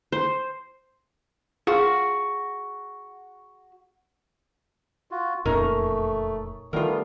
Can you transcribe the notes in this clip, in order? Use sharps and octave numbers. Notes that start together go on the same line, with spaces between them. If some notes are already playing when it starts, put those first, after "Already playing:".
C5
F4 F#4 G#4
F4 F#4
E1 F2 A#2 A3 C#4 D#4 A#4
D#3 G3 A3 B3 F4 A#4